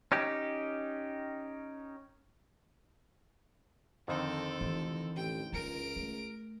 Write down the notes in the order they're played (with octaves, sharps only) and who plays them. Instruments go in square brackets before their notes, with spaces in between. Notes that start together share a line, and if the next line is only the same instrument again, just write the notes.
[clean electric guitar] C#4 D#4 G4
[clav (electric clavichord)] F2 D3 D#3 [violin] C4 A4
[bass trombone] F1 [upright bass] E3
[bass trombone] A1 [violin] G5
[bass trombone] C#2 [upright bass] F4 [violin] A#4 D7
[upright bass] A3